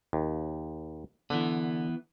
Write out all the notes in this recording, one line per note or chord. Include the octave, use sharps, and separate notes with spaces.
D#2
D3 E3 B3